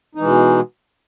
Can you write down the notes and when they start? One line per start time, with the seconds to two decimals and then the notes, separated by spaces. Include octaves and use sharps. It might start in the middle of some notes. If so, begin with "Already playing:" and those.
0.15 D#4
0.18 E3
0.20 G#3
0.23 B2